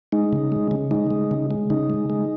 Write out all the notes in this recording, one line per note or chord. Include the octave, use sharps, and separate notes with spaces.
G#3 D#4
C#3
G#3
C#3
G#3 D#4
G#3
C#3
G#3
C#3 D#4
G#3
G#3